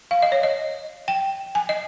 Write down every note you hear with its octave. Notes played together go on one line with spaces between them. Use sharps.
F5
D#5
C#5
D#5
G5
G#5
D#5